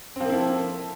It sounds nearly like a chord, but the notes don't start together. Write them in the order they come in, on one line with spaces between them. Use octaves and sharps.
C4 F3 A#3 E4 A4